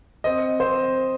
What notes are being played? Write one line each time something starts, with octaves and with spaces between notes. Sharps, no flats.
C4 D#5
C4 C5